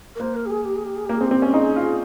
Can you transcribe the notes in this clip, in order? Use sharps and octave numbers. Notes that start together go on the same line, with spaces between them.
A#4
A#3 C5
A#4
G4
G#4
G4
G#4
G4
G#4
A#3 G4
C4 G#4
G4
C4
C#4
D#4 G#4
F4